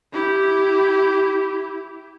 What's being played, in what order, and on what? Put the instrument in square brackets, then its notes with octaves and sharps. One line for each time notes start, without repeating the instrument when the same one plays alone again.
[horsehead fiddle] E4 G4